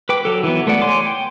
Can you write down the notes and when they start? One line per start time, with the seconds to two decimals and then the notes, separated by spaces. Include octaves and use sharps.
0.09 B4 G5 D6
0.25 F#3 A4
0.43 E3 F#3 B3
0.67 A3 B3 A4 D5 F#5
0.81 C#5 G#5 C6 D6
1.06 G5